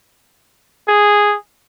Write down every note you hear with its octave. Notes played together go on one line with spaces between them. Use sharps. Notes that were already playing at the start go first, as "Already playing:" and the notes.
G#4